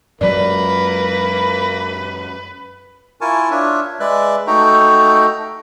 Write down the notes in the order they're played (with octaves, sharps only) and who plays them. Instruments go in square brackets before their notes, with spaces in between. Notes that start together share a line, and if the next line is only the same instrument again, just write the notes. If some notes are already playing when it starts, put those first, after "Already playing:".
[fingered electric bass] F#2 F#3 G#3 [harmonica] A#3 [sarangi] B4 [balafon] D5
[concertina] E4 F4 A#4 G#5 A5 C#6
D4 F4 C#5 E5
G#3 B4 D5 E5 F#6
A3 D#4 F#4 A4 G5 A#5